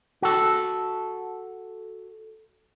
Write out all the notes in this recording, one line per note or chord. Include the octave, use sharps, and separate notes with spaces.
F#4 A4